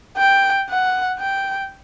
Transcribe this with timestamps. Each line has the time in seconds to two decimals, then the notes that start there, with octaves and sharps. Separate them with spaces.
0.17 G5
0.69 F#5
1.20 G5